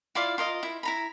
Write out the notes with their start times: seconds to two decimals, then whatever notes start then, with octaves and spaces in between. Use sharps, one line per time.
0.15 E4 F4 D5 F5
0.38 F4 A#4 D#5
0.63 E4
0.83 E4 A#5 B5